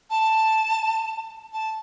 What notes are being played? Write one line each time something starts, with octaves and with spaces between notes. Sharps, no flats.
A5
A5